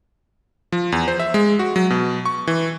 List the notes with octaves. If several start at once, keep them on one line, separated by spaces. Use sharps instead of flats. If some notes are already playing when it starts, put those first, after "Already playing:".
F3
E2
C5
E5
G#3
F#4
F#3
B2
C#6
E3